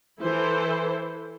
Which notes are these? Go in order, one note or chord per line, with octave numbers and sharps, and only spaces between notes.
E3 E4 A4 C5